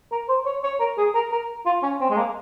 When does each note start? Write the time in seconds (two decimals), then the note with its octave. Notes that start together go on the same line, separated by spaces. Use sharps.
0.12 A#4
0.29 C5
0.46 C#5
0.63 C#5
0.80 A#4
0.98 G#4
1.14 A#4
1.32 A#4
1.66 F4
1.83 C#4
2.00 C4
2.10 G#3
2.17 A#3